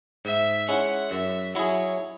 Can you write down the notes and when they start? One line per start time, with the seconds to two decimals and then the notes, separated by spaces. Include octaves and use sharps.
0.25 G#2 E5
0.68 G#3 C#4 E4 F#5
1.11 F#2 E5
1.54 F#3 E4 G#4 C#5